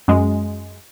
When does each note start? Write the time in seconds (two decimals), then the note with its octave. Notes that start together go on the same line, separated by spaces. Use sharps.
0.08 F#2 G#3